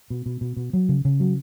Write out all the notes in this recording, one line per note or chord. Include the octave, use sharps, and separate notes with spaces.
B2
B2
B2
B2
F#3
C#3
C#3
F#3